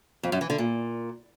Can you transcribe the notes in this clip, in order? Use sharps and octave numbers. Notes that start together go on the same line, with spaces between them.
F2
F#2
E3
D3
A#2